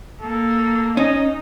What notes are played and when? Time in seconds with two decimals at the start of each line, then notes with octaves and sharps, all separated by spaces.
0.21 A#3 A4
0.97 C#4 D#4 D#5